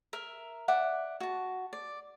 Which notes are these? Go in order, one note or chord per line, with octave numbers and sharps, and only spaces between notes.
A#4 E5
D5 E5 F#5
F#4 A5
D5